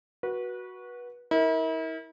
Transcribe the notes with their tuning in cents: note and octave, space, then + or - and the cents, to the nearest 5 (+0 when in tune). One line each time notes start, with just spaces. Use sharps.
F#4 +0 B4 -25
E4 -40 A#4 +0